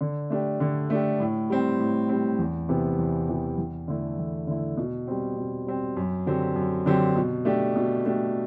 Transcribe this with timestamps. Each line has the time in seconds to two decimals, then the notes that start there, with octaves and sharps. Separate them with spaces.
0.01 D3
0.30 A3 D4 G4
0.60 D3
0.90 A3 D4 G4
1.20 A2
1.50 G3 C4
1.79 A2
2.09 G3 C4
2.39 E2
2.69 C3 E3 B3
2.98 E2
3.28 C3 E3 B3
3.58 E2
3.88 D3 A3 E4
4.18 E2
4.47 D3 A3 E4
4.77 B2
5.07 G3 C4
5.37 B2
5.67 G3 C4
5.97 F#2
6.26 D3 F#3 C4 G4
6.56 F#2
6.86 D3 F#3 C4 G4
7.16 B2
7.45 A3 D4 G4
7.75 B2
8.05 A3 D4 G4